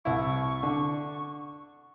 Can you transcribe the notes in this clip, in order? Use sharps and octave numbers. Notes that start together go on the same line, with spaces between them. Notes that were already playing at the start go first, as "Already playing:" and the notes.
C2 E4 C#6
D3